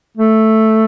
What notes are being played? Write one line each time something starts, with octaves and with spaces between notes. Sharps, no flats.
A3